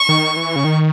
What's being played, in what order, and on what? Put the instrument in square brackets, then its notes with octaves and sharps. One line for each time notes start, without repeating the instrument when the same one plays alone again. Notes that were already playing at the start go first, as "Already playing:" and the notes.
Already playing: [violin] C#6
[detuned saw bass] D#3
E3
C#3
D#3